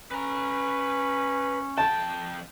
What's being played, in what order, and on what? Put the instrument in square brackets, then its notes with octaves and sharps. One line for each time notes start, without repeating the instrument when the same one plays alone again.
[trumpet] C#4 [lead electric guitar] B4 A#5
[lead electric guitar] F2 G5 [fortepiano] A5